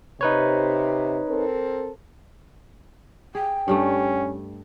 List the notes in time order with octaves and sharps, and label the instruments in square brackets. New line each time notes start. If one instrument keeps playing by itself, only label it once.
[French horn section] C3 [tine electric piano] D#4 B4 C#5
[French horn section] C4 A4 A#4
[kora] G#4 [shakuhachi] G5
[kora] G2 G3 A3 [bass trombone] C#4